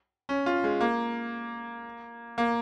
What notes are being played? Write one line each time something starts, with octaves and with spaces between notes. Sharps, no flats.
C#4
F4
G#3
A#3
A#3